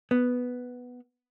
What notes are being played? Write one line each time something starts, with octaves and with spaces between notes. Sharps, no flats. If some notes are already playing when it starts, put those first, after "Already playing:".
B3